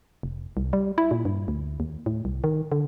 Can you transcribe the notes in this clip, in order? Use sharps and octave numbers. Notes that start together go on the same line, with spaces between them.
F1
C2
G3
E4
A#2
G2
D2
D#2
A2
C2
D#3
D3